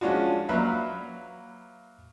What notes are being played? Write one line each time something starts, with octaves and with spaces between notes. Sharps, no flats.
F3 G#3 C#4 D4 F4 F#4
F#3 A#3 B4 E5 F5